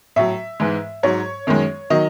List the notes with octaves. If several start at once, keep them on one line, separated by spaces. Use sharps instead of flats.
A2 F#3 E5
G#2 E3 G#3
G#2 F#3 C#5
F#2 D#3 G#3
D#3 F#3 D#5